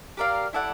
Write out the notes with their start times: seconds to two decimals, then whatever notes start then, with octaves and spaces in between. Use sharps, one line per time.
0.17 G4 A#4 D5 F5
0.53 E4 A4 D5 F#5